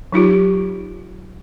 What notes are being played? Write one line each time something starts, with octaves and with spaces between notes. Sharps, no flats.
F#3 D#4 F4 G4